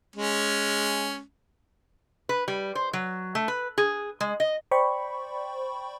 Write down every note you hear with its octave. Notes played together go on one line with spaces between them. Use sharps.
G#3 C#4
B4
G3
C5
F#3
A3
B4
G#4
G#3
D#5
C5 D5 G5 B5 C#6